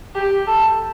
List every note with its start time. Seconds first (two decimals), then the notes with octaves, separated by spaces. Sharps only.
0.15 G4
0.47 A4